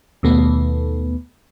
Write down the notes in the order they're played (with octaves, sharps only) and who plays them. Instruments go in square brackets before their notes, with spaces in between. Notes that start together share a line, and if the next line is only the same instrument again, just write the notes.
[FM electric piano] D#2 B2 A3 B3